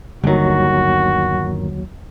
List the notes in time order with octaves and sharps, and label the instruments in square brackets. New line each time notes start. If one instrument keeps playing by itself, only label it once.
[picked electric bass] G1 D#3 [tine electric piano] D#2 F#3 [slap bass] D3 G3 [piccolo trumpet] F#4